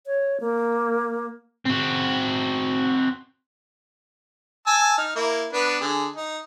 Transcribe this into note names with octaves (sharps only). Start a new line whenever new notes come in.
C#5
A#3
C4 F#4
G#5 A5 E6
D#4 F6
A#3 E4
B3 D4 B4
D3 G#4
D#4